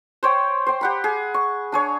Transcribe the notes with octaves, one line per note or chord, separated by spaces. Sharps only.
C5 C#5 G5
C5 G5
G4 F#5 B5
G#4
C#6
D4 G#4 C#5